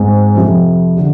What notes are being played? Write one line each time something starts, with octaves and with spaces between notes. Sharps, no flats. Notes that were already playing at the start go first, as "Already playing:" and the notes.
Already playing: G#2 G#3 C4 G#4
F2 C3 F3
D3